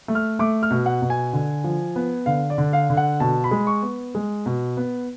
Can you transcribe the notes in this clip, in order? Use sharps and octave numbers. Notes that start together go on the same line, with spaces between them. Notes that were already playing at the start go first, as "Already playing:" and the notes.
A3
F6
A3 D6
F6
B2
F#5
B2
G#5
D3
F3
B3
D3 F5
D5
D3
F5
D3
F#5
B2 A5
B5
G#3
C#6
B3
G#3
B2
B3